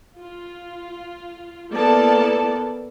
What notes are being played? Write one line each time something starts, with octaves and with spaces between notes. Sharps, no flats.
F4
A#3 B3 E4 A4 D5 A5